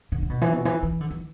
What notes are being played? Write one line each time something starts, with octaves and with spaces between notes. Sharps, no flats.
D3
D3
B2
E3
B2
E3
E3
D3
E3